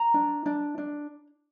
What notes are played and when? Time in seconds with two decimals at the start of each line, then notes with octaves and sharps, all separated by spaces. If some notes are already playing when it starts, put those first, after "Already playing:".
Already playing: A#5
0.14 D4
0.46 D4
0.78 D4